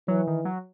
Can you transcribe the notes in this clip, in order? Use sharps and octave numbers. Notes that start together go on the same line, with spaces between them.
E3 F#3
D#3
F#3